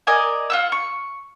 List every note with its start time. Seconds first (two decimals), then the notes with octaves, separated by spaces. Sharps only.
0.07 A#4 D5 D#5 G#5
0.50 F4 F#5 E6
0.72 C#6